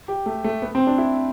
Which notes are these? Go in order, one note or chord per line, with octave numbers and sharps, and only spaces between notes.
G4
A3
A3
B3
C4
D4
E4